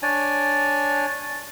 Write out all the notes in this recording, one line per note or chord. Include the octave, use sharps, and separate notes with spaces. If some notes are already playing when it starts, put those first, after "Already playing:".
D4 C#5 D5 G#5